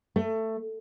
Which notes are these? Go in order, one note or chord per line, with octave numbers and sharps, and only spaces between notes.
A3